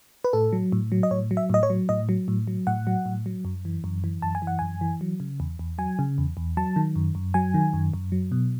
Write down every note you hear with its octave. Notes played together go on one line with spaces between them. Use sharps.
B4
A2 A4
F#3
A2
F#3
D#5
A2 C#5
F#3
E5
A2 D#5
C#5
F#3
A2 D#5
F#3
A2
F#3
A2 F#5
F#3
A2
F#3
F#2
E3
F#2
E3
F#2 A5
G#5
E3
F#5
F#2 G#5
E3
F#3
C#3
E2
E2
F#3 G#5
C#3
E2
E2
F#3 A5
D#3
F#2
F#2
F#3 G#5
D#3
F#2
F#2
F#3
B2